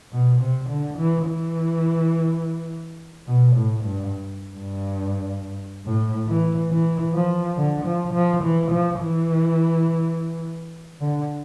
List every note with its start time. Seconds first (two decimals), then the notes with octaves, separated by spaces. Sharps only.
0.12 B2
0.41 C3
0.69 D3
0.98 E3
1.27 E3
3.27 B2
3.56 A2
3.84 G2
4.56 G2
5.85 A2
6.28 E3
6.71 E3
7.14 F3
7.57 D3
7.86 F3
8.14 F3
8.43 E3
8.71 F3
9.00 E3
11.01 D3